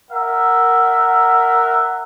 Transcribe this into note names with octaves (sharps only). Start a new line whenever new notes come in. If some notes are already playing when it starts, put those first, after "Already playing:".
A#4 E5 F#5